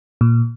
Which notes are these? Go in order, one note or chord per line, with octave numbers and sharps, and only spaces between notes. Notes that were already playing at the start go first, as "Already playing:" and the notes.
A#2